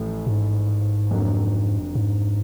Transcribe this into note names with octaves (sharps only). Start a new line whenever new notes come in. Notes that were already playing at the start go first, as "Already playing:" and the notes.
Already playing: A1 A2 F3 A3
G#2
F1 F2 D3 F#3 A#3
G#2